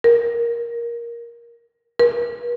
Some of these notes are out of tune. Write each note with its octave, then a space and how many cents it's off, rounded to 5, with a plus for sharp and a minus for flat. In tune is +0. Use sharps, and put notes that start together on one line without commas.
A#4 +10
A#4 +45